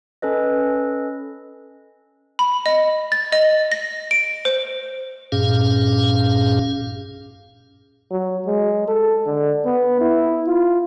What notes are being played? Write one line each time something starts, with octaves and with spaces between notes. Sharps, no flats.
C#4 A4 B4 D#5
B5
D#5
A6
D#5
A#6
D7
C5
G2 A#2 C#4 G#4 F5
F#3
G#3
A4
D3
B3
E4
F4